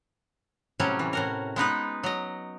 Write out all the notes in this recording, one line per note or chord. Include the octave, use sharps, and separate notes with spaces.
A2 C3 F#3 G3 C#4
E3
A2 F#4 A#4
G#3 B3 D#4 B4
F#3 D#5